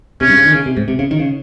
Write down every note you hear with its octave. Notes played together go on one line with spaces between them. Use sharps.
C3 C#4
G2
C#3
D#3
C#3
C3
G#2
C3
C#3
D#3
C#3